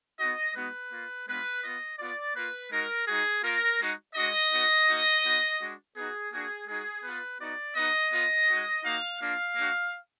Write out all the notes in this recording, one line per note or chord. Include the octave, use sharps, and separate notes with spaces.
B3 D#4 F#4 D#5
G#3 B3 D#4 F#4 B4
A#3 F4
G#3 B3 D4 F4 B4
B3 F4 D#5
B3 F4 D5
A#3 F4 B4
G#3 D#4 F#4 A#4
G#3 D#4 F#4 G#4
A#3 F4 A#4
G#3 D#4 F#4
G#3 D4 F#4 D#5
B3 D#4 F#4
A#3 D#4 F#4
B3 D#4 F#4
G#3 D4 F#4
B3 D#4 F#4 G#4
A#3 D4 F#4 G#4
G#3 D#4 F#4 G#4
B3 F4 B4
B3 D#4 F#4 D5
B3 D#4 F#4 D#5
B3 F4
G#3 D#4 F#4
A#3 D#4 F#4 F5
A#3 D4 F4 F5
A#3 D4 F#4